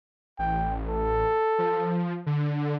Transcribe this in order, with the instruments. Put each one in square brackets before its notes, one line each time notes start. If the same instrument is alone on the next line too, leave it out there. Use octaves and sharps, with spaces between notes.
[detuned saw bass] A1 [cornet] G5
[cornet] A4
[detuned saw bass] F3
D3